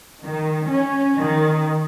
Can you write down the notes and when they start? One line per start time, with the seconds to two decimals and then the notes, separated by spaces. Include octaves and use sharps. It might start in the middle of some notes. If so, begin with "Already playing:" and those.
0.23 D#3
0.69 C#4
1.17 D#3